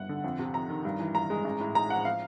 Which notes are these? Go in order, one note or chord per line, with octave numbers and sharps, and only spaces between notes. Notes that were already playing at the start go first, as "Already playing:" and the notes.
Already playing: G1 G2 F#5
D3
F2
C3
F2 A#5
D#3
G2
E3
G2 A#5
G#3
A1
A2
G#3 A#5
F3 F#5
F5